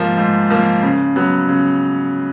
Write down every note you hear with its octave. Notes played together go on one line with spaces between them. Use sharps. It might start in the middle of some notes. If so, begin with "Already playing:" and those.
Already playing: G#2 F3 A#3
G#2
F3 A#3
C#3
F#3 B3
C#3